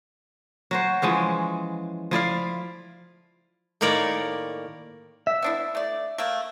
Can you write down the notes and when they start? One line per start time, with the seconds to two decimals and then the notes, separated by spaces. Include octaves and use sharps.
0.71 F#3 F#4 C5
1.02 E3 F3 G#3 C#4
2.11 F3 E4 D5 F5
3.81 A2 D#3 A#3 A#4 C#5 D5
5.27 E5
5.42 B3 D4 E4
5.75 A3 D5
6.18 A3 A#3